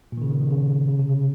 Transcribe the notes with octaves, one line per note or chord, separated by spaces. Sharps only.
A#2
D#3
C#3
D#3
D#3
C#3
C#3
C3
C#3